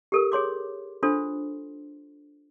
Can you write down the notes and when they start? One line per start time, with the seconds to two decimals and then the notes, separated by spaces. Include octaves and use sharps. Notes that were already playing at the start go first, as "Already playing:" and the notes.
0.12 G4 A4 A#4
0.32 G#4 C#5 C6 D6
1.03 D4 F4 A4 C5 C6